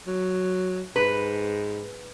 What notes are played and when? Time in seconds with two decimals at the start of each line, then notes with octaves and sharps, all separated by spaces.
0.07 F#3
0.96 G#2 B4